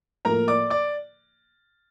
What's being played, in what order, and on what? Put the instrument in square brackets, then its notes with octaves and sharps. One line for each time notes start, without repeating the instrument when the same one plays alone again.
[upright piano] A2 F3 A#3 [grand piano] A#4 A#5
[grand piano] D5 D6
D5 D6